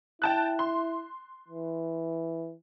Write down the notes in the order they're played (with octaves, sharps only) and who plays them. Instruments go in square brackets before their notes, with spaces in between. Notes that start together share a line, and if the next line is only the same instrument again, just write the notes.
[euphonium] E4 [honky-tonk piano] G5 A5 F#6
[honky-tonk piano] C6
[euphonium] E3